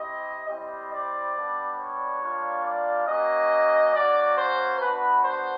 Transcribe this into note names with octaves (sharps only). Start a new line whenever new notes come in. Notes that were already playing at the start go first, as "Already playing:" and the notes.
Already playing: C4 E4 G4 D#5
G3 C4 E4 G4 D#5
D5
G3 B3 D4
C#5
G3 A#3 D4 F4
D5
A#3 C#4 F#4 D#5
A#3 C#4 F#4 D5
C5
B3 D4 F#4 B4
C5